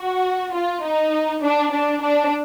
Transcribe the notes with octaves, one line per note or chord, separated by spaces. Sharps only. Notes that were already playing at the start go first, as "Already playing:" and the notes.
Already playing: F#4
F4
D#4
D4
D4
D4